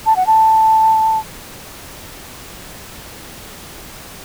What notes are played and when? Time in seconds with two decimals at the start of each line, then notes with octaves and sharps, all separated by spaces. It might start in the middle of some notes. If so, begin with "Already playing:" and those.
0.06 A5
0.16 F#5
0.27 A5